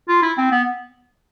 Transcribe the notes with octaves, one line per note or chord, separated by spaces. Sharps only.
F4
E4
C4
B3